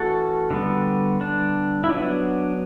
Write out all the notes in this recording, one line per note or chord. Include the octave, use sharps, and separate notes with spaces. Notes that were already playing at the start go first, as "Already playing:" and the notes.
Already playing: E3 A3 C#4 F#4 A4
D3 G3 B3
D4
E4
F#3 B3 D4